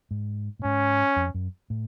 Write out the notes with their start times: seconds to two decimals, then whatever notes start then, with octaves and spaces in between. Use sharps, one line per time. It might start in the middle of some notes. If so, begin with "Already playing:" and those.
0.11 G#2
0.59 A2
0.64 G#2 C#4
1.16 F2
1.34 F#2
1.70 A2